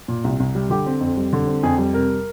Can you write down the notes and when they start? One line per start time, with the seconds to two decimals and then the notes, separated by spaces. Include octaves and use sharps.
0.08 A#2
0.24 C2
0.40 C2
0.55 G3
0.70 D3 G4
0.86 C4
1.01 F2
1.17 G3
1.33 D3
1.47 C4
1.63 F2 G#4
1.78 G3
1.94 C3 A#4